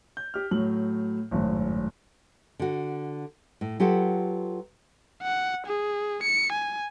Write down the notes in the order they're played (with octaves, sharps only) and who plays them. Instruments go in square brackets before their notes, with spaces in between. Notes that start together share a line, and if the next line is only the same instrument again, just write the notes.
[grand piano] G6
G4 F6
A2 F#3 F#7
G#1 F#2 A2
[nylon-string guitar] D3 F#4
A2
F#3 F4 G4 A4 B4 F#5
[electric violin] F#5
G#4
C#7
G#5